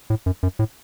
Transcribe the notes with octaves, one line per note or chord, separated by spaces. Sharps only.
A2
F#2
F#2
A2